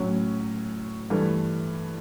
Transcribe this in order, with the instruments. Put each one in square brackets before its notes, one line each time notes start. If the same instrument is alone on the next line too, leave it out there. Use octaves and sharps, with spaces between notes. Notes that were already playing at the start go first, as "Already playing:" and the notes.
Already playing: [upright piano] A2 F#3 C#4
G2 E3 A3